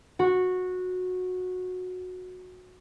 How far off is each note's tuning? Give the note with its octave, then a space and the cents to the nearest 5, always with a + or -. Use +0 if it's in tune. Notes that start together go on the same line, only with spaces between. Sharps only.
F#4 -15